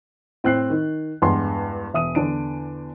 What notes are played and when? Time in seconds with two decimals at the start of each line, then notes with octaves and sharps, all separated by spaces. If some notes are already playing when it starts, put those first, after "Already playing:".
0.44 A2 C4 G5 F#6 C7
0.70 D#3
1.22 E2 G2 G#3 F#5 C6
1.94 E1 E5 D#6 D#7
2.15 E2 D3 D4 D7